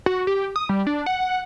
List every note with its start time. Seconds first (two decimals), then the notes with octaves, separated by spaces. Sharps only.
0.06 F#4
0.27 G4
0.56 D#6
0.69 G3
0.87 D4
1.06 F#5